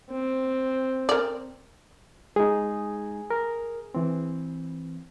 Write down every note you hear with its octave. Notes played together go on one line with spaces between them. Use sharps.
C4
A#4 D5
G#3 D#4 G#4
A#4
E3 C4